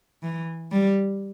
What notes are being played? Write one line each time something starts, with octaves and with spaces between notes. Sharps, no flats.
E3
G3